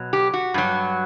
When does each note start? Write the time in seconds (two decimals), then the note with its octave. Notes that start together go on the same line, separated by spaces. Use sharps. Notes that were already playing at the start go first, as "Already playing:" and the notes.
Already playing: B2 F#3
0.13 G4
0.34 F#4
0.54 G2 F#3